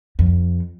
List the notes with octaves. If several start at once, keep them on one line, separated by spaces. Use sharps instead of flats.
F2